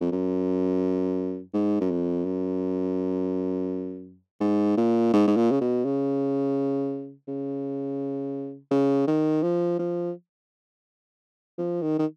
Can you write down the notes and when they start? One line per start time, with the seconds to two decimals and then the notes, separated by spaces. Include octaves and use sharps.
0.01 F2
0.11 F#2
1.54 G#2
1.81 F#2
1.91 F2
2.25 F#2
4.40 G#2
4.77 A#2
5.13 G#2
5.27 G#2
5.36 A#2
5.51 C#3
5.61 B2
5.85 C#3
7.28 C#3
8.71 C#3
9.07 D#3
9.42 F3
9.79 F3
11.58 F3
11.82 D#3
11.99 D#3